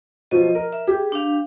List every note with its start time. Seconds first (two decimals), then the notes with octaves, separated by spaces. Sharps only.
0.31 B2 F3 F#3 D#5
0.55 A#4
0.72 E5
0.87 G4 G#4
1.12 D4 F5